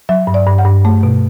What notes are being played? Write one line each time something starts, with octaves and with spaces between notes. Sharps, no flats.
F#3 E5
G2
D5
G2
F#5
G2
A3
B2